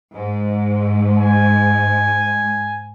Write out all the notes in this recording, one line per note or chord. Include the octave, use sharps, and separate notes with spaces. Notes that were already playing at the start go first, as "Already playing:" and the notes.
G#2
G#5